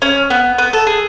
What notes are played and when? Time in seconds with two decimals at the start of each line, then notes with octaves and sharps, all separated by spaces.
0.02 C#4
0.30 B3
0.58 B3
0.73 A4
0.87 G#4